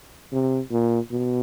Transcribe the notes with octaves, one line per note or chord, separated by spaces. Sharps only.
C3
A#2
B2